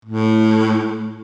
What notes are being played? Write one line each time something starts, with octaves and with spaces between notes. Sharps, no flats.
A2